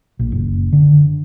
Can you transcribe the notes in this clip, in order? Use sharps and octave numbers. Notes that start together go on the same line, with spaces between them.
A#1
F#1
D3